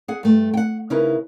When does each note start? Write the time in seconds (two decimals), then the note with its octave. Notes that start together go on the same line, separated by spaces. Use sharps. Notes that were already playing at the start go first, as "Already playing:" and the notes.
0.08 G#4 F#5
0.23 G2 A3
0.54 F#5 G5
0.90 C#3 D#4 E4 A#4 B4